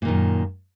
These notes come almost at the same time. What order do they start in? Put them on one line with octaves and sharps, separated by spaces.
A#2 D#3 F#2